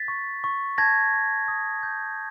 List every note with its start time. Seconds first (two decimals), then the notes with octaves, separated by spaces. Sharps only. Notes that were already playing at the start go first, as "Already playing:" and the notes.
Already playing: A6 B6
0.08 C#6
0.44 C#6
0.78 A5 G#6 A#6
1.13 C#6
1.48 D#6
1.83 G6